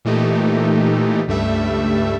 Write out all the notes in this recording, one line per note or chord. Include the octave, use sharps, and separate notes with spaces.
A#2 E3 A3 D#4 G4
C#2 G2 G3 A3 E5